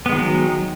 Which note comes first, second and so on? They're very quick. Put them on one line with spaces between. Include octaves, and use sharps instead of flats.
B3 G#3 D#3 F#3